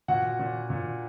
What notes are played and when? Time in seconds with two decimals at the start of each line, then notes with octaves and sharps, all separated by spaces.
0.08 A#2 F#4 F#5
0.39 A#2
0.70 A#2